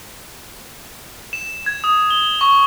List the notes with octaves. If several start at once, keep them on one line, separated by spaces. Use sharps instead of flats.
E7
G#6
D#6
G7
C#6